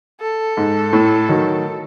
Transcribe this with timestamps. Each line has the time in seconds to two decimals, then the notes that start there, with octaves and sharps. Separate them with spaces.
0.21 A4
0.57 G#2
0.93 A2
1.29 D#3 F#3